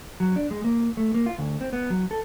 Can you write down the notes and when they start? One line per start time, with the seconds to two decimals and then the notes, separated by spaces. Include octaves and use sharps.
0.20 F#3
0.36 D4
0.51 G#3
0.64 A#3
0.97 A3
1.14 A#3
1.26 F4
1.38 D2
1.61 C4
1.73 B3
1.90 F#3
2.11 A4